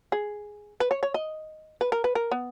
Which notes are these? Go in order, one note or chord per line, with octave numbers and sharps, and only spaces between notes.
G#4
B4
C#5
C#5
D#5
B4
A#4
B4
A#4
B3